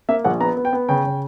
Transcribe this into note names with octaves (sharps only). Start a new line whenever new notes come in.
A#3 E5
A#1 F#5
B3 A#5
B3
G5
B3
C#3 G5
C#3